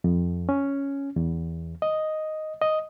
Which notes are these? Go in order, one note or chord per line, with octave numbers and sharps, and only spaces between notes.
F2
C#4
E2
D#5
D#5